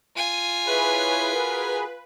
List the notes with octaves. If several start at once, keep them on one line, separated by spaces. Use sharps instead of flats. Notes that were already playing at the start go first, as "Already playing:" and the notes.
F4 G#5 D#7
E4 G#4 B4 C#5
F#4 G#4 A#4